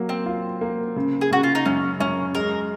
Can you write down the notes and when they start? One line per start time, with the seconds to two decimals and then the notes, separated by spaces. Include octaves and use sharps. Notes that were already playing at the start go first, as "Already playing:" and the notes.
Already playing: F#3 A#3
0.09 C4
0.26 F4
0.61 A#3
0.96 C#3
1.21 G#4
1.31 C#3 F#4
1.43 F4
1.55 D#4
1.66 F#2 C#4
2.00 F#2 C#4
2.35 G#3 A#4